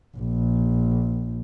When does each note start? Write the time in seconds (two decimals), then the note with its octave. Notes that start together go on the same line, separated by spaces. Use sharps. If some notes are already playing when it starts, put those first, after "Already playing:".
0.17 A#1